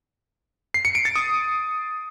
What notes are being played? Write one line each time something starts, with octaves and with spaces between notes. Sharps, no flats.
C7
C#7
D7
A6
D#6